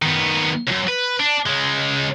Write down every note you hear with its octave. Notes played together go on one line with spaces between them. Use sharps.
D#3 B3
C#2 F#2
B4
D4
C#2 G#3